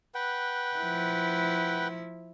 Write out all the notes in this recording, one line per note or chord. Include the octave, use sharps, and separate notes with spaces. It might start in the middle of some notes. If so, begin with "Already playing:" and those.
B4 F#5 G5
F3 E4